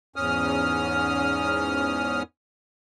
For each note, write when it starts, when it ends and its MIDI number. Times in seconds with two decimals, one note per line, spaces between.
0.16 2.23 40
0.16 2.23 44
0.16 2.23 61
0.16 2.23 87
0.16 2.23 89